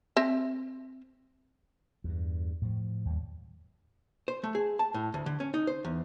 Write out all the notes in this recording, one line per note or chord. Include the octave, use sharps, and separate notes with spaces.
C4 E5
E2 G2
A2 F3
D#2 G3
C5
A3
G#4
A5
A2
D2
D3
C#4
D#4
C5
E2